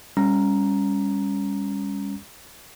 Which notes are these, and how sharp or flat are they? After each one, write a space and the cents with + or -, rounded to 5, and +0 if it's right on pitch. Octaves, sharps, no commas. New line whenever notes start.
G3 +30 C#4 +0 A#5 +0